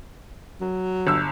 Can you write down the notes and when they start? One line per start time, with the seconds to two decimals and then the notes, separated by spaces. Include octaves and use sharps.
0.61 F#3
1.07 G1 E6